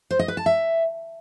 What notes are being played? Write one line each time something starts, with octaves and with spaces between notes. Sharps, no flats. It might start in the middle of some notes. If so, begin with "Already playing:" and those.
C5
D#5
B4
A5
E5